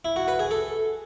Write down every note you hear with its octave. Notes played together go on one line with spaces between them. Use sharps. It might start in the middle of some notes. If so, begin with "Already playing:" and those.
E4
F#4
B4
G#4
A4